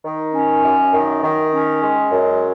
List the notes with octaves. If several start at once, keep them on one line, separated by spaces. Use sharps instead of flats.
D#3
C#4
F#2
D#3
D#3
C#4
G#3
F#2